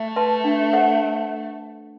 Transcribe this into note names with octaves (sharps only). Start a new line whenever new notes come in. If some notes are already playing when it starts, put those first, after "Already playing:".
Already playing: A3
B4 E5 A5 C6
D4
A4 C5 F#5